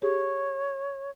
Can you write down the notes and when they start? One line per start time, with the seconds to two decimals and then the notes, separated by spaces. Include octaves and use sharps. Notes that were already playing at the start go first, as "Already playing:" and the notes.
0.02 G4 G#4 C#5